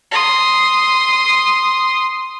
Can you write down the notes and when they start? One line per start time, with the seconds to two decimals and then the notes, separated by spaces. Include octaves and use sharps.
0.12 C6 D#6